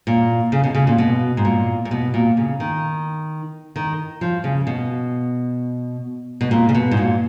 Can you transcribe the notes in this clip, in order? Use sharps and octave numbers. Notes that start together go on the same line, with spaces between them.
A#2
C#3
B2
C#3
A#2
B2
G#2
A#2
A#2
B2
A#2
C#3
D#3
D#3
F3
C#3
B2
B2
A#2
C#3
B2
G#2
A#2